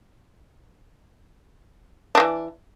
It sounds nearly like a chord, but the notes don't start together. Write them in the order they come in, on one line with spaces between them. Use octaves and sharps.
D4 D#3 E3